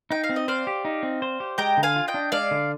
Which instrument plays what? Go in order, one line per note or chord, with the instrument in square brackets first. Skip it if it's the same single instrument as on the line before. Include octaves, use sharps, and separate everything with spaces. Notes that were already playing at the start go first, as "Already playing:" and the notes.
[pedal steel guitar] D#4 [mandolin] G5
[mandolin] F5
[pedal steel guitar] C4
[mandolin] D#5
[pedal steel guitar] C5 [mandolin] D5 F5
[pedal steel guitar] G4
D#4
C4
C5
G4
[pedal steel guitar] G#3 [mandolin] G5 A#5
[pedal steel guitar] D3
[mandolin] F5 G#5
[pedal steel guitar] F4
[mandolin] D#5 G5
[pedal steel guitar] D4
[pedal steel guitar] G#3 [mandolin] D5 F5
[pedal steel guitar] D3